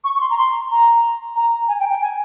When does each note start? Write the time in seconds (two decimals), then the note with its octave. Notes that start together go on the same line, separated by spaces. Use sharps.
0.04 C#6
0.15 C#6
0.21 C6
0.30 A#5
0.38 C6
0.70 A#5
1.35 A#5
1.68 G#5
1.80 G5
1.90 G5
2.01 G#5